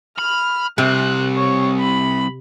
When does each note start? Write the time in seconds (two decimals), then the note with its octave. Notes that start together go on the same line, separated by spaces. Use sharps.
0.18 B5 F6
0.78 C3 G3 C4 F#6
1.36 C#5
1.80 B5